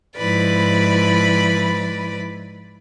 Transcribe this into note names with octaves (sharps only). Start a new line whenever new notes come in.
G#2 F3 E4 B4 D5 B5